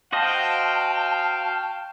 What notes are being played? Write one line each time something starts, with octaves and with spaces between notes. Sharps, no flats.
F#4 C5 D#5 F5 G5 A5